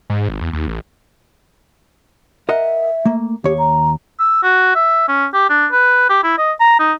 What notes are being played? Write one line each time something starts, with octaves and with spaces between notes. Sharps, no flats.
G#2
G#1
E2
D#2
A1
A#4 D#5 E5 F#5
A3 A#3
D#2 G4 C#5
A#5
E6
F#4
E5
C#4
G4
D4
B4
G4
E4
D#5
A#5
D#4